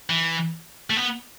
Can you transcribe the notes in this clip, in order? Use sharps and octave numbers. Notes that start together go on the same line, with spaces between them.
E3
A3
B3